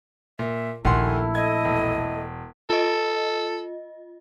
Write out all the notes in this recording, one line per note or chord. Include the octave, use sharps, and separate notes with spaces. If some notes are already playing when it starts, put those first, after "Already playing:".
A#2 E5
A#1 D#2 A3 E4 A4 F#5 G#5 C6
D#5 G#6
E1
F4 A4 D#5